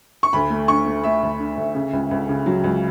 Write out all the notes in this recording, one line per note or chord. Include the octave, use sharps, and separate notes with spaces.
C#6
D2 B5
A3
D3 C#6
A3
A3 E5
D2
D3
D2
C#3
C#2
C#2
C#3
F#3
C#2